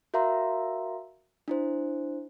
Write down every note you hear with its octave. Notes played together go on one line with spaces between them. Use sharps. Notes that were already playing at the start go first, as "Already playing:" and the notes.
F#4 A#4 E5 F5 A#5 C6
D4 E4 C5